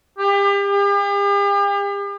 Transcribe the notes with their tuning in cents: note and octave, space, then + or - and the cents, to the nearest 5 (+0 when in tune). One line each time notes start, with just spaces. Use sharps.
G4 +35
G4 +45